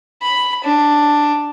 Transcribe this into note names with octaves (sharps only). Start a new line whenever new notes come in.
B5
D4